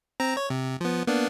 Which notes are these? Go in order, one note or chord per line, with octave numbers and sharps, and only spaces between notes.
C4 A#5
C#5
C3
F3 B3
A#3 B3 D4